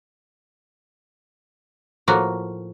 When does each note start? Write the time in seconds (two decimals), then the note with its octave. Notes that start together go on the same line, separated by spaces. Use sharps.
2.08 A2 F3 A#3 F#4